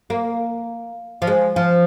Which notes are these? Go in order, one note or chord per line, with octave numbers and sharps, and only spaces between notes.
A#3
F3
G#3
F3